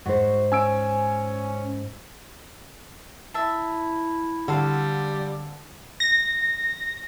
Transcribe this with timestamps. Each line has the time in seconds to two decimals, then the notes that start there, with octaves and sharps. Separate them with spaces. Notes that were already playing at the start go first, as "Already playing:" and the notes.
0.06 G#2 F#4 C5
0.52 C#4 G#5 E6 D7
3.34 E4 E5 A5
4.48 D3 G3 F#4 A4 F5
6.00 A#6